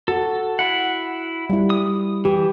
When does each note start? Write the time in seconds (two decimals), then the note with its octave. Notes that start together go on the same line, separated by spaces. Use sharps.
0.08 F#4 A4
0.59 E4 F#5
1.50 G3 E4
1.70 D#6
2.25 E3 G4